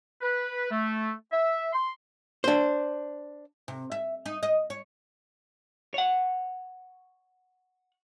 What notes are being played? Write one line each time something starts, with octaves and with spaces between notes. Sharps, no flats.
B4
A3
E5
C6
D4 C5
C3
E5
D#4
D#5
C#5
C#5 F#5